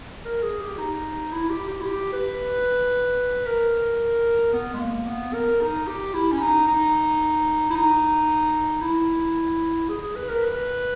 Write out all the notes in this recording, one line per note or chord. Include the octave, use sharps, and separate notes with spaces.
A#4
G#4
G4
D#4
E4
G4
G4
E4
G4
B4
A#4
B3
G#3
A#3
B3
A#4
D#4
G4
E4
C#4
D#4
D#4
E4
D#4
E4
G#4
G#4
B4
A#4
B4